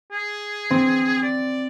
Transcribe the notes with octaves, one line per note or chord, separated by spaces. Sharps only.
G#4
C4
D5